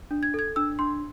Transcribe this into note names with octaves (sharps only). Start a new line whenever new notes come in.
D4
G#6
A4 G#6
D4 E6
D4 C6